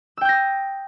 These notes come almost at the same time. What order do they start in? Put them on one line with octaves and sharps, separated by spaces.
E6 G5 G6 A#6 D#6